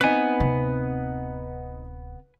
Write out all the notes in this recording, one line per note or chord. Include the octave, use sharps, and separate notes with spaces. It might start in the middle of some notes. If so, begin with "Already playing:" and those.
B3 C4 D#4 B4 G#5
D1 C3